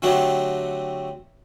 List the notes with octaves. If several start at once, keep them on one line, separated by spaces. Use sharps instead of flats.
D3 F#3 A3 C4 F#4 G4